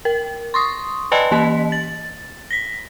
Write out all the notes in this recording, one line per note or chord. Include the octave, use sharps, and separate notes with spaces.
A#4
C6 C#6 D#6
B4 D5 D#5 G5 A5 B5
E3 A#3 D#5 B6
A6
A#6 B6